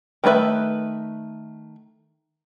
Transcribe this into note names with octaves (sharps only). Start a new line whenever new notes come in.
D#3 A3 F4 B4 E5